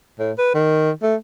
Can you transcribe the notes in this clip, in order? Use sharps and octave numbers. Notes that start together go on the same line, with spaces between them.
A2
B4
D#3
A3